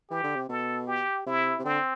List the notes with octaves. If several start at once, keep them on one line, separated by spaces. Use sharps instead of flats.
E3 G4
D3
C3
B2 A4
G4
C3 E4
C3
D3 C4